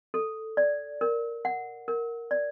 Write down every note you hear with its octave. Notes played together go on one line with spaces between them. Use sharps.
A4
D5
A#4
F#5
A#4
D5